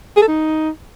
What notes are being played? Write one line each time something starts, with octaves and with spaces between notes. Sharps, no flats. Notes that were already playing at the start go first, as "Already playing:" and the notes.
G#4
A4
D#4